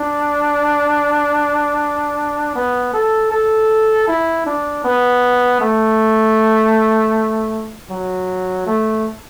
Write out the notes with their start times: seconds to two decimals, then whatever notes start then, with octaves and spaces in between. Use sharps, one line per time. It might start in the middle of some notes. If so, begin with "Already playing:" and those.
Already playing: D4
2.55 B3
2.93 A4
3.32 A4
4.08 E4
4.46 D4
4.84 B3
5.61 A3
7.90 F#3
8.66 A3